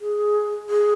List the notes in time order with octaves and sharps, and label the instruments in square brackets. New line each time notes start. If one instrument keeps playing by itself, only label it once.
[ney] G#4
G#4